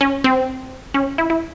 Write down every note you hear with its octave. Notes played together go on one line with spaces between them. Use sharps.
C#4
C4
C#4
E4
E4